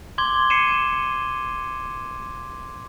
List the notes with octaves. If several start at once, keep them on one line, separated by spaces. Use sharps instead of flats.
C6 D6 G#6 G7
C7 C#7 D#7 E7